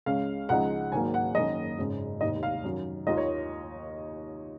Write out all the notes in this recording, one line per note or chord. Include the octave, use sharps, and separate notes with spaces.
C#2 C#3 G#3 C#4 F5
C#2 C#3 F3 G#3 D#4 F#5
G#1 G#2 D#3 F#3 A#3 G#5
F#5
F#1 F#2 D#3 A#3 D#5
G#1 F#2 C#3 G#3
F1 D#2 D#3 D#5
F5
F#2 D#3 F#3
D#2 D#3 A#3 F4 D#5
C#5